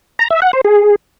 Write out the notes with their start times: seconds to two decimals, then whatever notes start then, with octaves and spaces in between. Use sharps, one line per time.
0.19 A#5
0.30 E5
0.42 F#5
0.53 C5
0.64 G#4